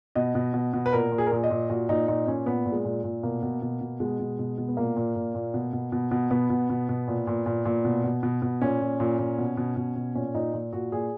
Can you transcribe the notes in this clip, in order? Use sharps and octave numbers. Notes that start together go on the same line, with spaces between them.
B2 D#5
B2
B2
B2
B4
A#2 A#4
A#2
G#4
A#4
A#2 G#4
D#5
A#2
A#2 F#4
A#2 D#4
A#2 D#4
A#2 C#4
A#2 B3
A#2
G#3
A#2
A#2
B2 A#3
B2
B2
B2
B2 G#3
B2
B2
B2
B3
A#2 A#3
A#2
A#2
A#2
B2
B2
B2
B2
B2 B3
B2
B2
B2
A#2
A#2
A#2
A#2
B2
B2
B2
B2
A#2 C#4
A#2
A#2
A#2
B2
B2
B2
B2
A#2 C#4
A#2 D#4
A#2
A#2 F#4
A#2 G#4